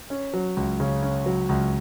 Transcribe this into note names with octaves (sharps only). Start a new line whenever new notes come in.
C#4
F#3
C#2
C#3
C#4
F#3
C#2